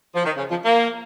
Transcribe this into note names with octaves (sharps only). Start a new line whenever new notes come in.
F3
D#3
C#3
F3
A#3